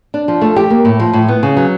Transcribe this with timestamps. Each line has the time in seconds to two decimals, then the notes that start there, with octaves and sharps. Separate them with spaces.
0.14 D4
0.28 F3
0.41 A3
0.56 G4
0.70 A#3
0.85 A2
1.00 F3
1.13 A2
1.28 B3
1.43 C#3
1.57 F#3